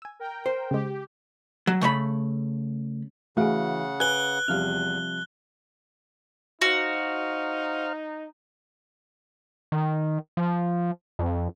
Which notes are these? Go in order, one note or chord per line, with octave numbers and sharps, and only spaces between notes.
G#5 E6
A#4 G5
C5
C#3 G#3 G4
F#3
C#3 A3 E5 B5
C#3 E3 A3 F#4 G#4 F5 F#5
B4 G#5 F#6 G7
E2 C3 F3 G3 F5 F6
D#4 F#4 C5 F5 F6
D#3
F3
F2